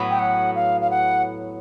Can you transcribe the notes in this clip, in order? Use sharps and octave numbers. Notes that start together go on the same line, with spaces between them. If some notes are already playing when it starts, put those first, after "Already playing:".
Already playing: A2 F#3 B3
G5
F#5
F5
F5
F#5